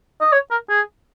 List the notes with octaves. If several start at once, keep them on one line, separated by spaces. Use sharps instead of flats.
D#5
C#5
A#4
G#4